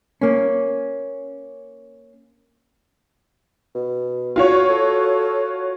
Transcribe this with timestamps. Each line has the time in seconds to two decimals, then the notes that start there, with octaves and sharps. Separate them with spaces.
0.21 A#3 C#4
3.75 B2
4.36 F4 F#4 C#5
4.70 A4